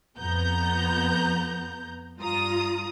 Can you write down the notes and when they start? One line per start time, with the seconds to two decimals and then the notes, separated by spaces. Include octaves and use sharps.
0.18 F2 B3 A#5 G6
2.19 G2 F4 A#5 D#6